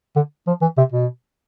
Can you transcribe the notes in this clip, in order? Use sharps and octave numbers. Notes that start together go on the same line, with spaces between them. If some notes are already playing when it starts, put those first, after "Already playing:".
D3
F3
E3
C3
B2